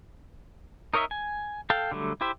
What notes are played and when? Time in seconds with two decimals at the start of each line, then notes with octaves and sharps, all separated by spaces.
0.94 D#4 A#4 C#5 D#5 E5
1.11 G#5
1.70 A4 F5 G5 A5
1.92 D3 F#3 G3 A3
2.21 E4 G4 C5 E5